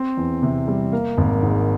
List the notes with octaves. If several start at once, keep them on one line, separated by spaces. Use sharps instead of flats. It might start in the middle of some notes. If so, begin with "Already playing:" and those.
Already playing: C4
E2
C3
G3
A#3
G#1
G#2